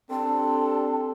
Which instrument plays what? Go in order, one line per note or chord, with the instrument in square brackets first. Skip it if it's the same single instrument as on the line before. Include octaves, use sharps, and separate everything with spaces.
[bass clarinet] C4 [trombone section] D4 G4 A4 [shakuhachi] A5